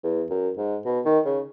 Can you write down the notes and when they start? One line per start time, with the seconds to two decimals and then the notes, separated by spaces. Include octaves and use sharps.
0.04 E2
0.30 F#2
0.57 G#2
0.85 B2
1.05 D#3
1.25 C#3